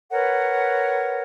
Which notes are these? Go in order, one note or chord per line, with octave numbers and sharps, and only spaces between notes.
A#4 B4 C#5 F#5